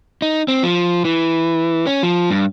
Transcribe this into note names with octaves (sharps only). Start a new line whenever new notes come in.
D#4
C4
F3
E3
C#4
F3
G2